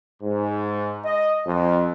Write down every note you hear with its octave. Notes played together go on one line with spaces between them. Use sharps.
G#2
D#5
F2